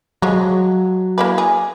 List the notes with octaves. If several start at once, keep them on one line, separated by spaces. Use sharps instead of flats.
F3 F#3 G#3 C#5
A#3 E4 B4
G#4